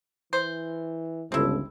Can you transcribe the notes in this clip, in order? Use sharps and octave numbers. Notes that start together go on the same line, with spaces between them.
E3 C5
G1 C#2 C4 E4 A4